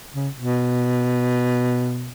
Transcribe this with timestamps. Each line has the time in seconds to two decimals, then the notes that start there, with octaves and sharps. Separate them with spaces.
0.14 C#3
0.36 B2